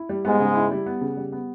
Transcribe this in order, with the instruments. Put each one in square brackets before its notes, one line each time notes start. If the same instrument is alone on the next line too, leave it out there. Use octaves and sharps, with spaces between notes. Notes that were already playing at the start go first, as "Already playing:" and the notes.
Already playing: [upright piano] E4
G3
[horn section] G#2 G#3 [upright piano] B3
[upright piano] C#3
E4
G3
B3
C#3
G3
B3